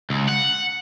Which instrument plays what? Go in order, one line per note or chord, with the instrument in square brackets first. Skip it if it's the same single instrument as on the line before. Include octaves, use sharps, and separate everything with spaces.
[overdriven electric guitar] C#2
F#5